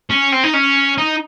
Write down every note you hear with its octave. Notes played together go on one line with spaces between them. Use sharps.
C#4
C4
D#4
C#4
D#4